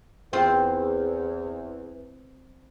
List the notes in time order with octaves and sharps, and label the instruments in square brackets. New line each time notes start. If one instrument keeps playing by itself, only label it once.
[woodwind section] E2 [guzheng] C4 F4